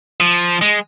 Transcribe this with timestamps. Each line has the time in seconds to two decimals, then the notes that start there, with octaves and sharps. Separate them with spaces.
0.21 F3
0.61 G#3